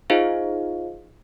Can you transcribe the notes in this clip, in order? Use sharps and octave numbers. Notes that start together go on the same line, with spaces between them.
D#4 F4 G#4 C5 D#5 F5